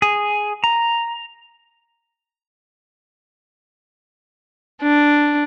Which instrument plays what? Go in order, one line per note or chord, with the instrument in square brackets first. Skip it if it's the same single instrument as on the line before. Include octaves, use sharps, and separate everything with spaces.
[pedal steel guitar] G#4
A#5
[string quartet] D4